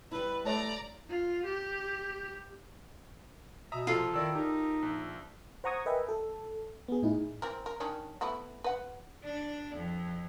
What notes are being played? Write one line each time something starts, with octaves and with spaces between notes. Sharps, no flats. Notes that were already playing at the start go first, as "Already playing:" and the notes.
G3 E4 B4
A3 C#5 D5 A5 A#5
F4
G4
B2 E5 A#5 D#6
C3 F3 F4 A4
D#3 E4 D5 E6
D#4 G4 A#4
A#1
C5 F#5 A#5 C#6 D#6 G#6
A#4 B4 D#5 E5 G5 G#5
A4
B3 G#4
A2 D#4 E4 G#4
E3 C4 A#4
A#4
D#3 C#4 D4
A3 B3 E4
B4 F#5
D4
F2